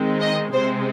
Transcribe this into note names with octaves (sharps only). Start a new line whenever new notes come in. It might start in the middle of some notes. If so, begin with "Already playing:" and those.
Already playing: D#3 G#3 C4
D#5
C3 G#3 C4 C5